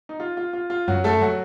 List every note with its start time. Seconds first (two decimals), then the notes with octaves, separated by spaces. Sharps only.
0.09 D#4
0.20 F4
0.37 F4
0.53 F4
0.70 F4
0.88 F#2 F#3 F#4
1.04 A3 A4
1.21 F#3 F#4